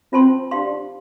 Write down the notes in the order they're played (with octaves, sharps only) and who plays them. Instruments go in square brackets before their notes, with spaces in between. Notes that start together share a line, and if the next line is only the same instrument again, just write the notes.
[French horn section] C4 [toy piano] F4 C5 A5 C6
[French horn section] D4 [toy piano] G4 F5 C6